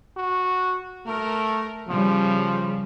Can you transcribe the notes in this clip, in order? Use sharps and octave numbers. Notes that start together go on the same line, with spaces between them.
F#4
A3 A#4
C#3 F3 G3